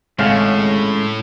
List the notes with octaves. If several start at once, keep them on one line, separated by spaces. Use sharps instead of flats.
G#1 A2 C#3 G#3 A3 C#4 F5